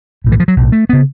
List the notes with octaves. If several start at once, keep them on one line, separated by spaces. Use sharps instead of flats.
B1 A2
E3
F3
F#3
B1 A2
A3
C#3 B3